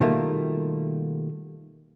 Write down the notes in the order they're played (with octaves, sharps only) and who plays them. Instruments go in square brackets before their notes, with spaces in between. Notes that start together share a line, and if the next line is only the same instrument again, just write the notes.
[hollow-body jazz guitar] B2 D#3 G3 A3 A#3 F4